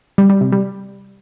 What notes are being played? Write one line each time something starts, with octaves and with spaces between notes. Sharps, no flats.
G3
G3
C3
G3